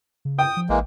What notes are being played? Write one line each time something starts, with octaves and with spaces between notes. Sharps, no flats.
C#3
G5 D#6
F3
A1 E3 G#3 A#3